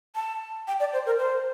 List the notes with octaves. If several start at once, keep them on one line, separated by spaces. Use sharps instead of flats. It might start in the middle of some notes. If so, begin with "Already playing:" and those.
A5
G5
D5
C5
A#4
C5